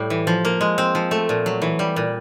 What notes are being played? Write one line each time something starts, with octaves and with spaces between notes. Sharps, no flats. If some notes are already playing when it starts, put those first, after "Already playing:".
Already playing: A2 G3
E3
F3
A#3
G#3
C4
F3
A3
A#2
F#3
E3
G3
A#2